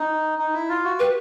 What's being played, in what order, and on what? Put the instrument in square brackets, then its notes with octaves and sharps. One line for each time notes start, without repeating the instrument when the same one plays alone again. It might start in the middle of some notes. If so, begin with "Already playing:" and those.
Already playing: [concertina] D#4
D#4
E4
F4
F#4
[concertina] G4 [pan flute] B4